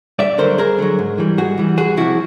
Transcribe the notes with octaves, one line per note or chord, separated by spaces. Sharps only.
G2 D5 E5
D3 F#3 A#4 C5
G2 G#4 A#4
D3 F#3
G#2
E3 G3
G#2 F#4 G#4
E3 G3
E2 F#4 G#4
C3 F3 E4 F#4